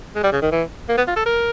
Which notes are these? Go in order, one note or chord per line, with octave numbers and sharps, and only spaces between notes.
G#3
G3
C#3
D#3
E3
A#3
B3
F4
A4
A#4